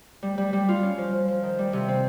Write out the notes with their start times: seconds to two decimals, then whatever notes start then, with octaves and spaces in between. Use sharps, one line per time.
0.23 G3
0.38 G3
0.53 G3
0.69 F4
0.83 C#4
0.98 F3
1.13 F3
1.28 F3
1.43 D#3
1.59 G3
1.73 C3
1.88 C4